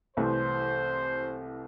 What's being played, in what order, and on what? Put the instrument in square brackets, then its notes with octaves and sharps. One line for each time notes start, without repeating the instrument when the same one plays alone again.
[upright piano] C2 C3 E3 A3 [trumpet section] C5